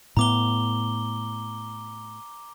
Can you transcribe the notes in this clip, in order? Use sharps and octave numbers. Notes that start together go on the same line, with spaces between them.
A2 B3 A#5 D6 G7